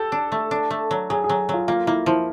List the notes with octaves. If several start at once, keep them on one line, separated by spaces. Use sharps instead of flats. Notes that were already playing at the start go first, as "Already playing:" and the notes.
Already playing: G4 A4
D4
A3
D4
A3
F#3
F#3 G#4
G#4
F#3
F#3 F4
A#3 F4
A#3 E4
F3 E4